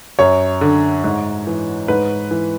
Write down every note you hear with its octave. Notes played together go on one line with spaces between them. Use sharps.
F#2 C#5
D3
G#2
E3
G#2 B4
E3